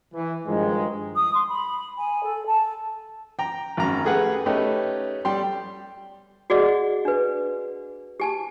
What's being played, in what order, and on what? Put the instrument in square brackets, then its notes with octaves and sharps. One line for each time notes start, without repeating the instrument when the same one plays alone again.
[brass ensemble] E3
G2 D#3 F3 G#3
[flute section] D#6
C6
B5
G#5
A4
A5
[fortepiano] G5 A#5
G#1 F#2 A#5
A3 G4 G#4 B4 F#5
A3 C#4 D#4 G4 B4
G3 G4 C6
[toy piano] F#4 G#4 D5 D#5 F#5
D4 B4
G4 G#5 A5